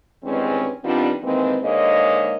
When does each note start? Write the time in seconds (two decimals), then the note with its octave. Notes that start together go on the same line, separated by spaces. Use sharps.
0.24 E2 G2 D#3 G#3 C4 C#4
0.84 D#3 G3 B3 C4 D4 F4
1.23 D#3 E3 G#3 A#3 C4
1.62 G#2 D3 G#3 A#3 C#5 D#5